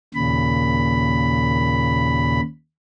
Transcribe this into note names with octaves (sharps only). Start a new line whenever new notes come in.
D#2 A#2 C#3 B5